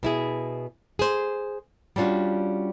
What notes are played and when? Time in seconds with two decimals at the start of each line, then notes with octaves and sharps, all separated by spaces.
0.03 B2 E4 G#4
0.99 G#4 C5
1.96 G3 C#4 D4 F4 F#4